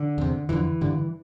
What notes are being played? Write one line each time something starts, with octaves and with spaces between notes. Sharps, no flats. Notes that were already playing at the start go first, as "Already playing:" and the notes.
Already playing: D3
E2 C3
F2 D3 E3
G2 D3